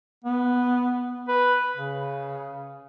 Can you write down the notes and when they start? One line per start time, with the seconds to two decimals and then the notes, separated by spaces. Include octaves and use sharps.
0.24 B3
1.28 B4
1.76 C#3